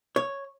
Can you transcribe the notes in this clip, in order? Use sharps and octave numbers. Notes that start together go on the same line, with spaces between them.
C#5